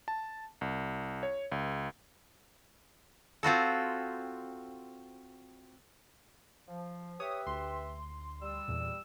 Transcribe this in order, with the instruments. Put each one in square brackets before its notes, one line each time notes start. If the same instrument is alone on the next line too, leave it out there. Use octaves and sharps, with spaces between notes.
[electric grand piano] A5
C2
C#5
C#2
[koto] C4 F4 F#4 A4
[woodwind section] F3
[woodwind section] G4 B4 E5 [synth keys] C#5 D#6
[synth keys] D2 C6
[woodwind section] G3 E6
[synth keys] E2 A#2